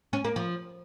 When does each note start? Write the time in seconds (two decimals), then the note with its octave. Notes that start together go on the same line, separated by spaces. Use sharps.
0.13 C#4
0.24 A#3
0.36 F3